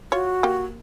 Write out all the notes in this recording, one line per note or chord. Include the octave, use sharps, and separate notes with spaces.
F4 F#4 C#5
A#3 G4